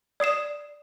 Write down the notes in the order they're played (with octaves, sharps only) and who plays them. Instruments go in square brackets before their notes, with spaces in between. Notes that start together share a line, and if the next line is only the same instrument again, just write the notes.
[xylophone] D5 D#6 C7 E7